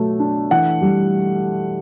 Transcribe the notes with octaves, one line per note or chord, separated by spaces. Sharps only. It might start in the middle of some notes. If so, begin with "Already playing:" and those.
Already playing: B2 F#3 A3
D4
E3 F#5
G3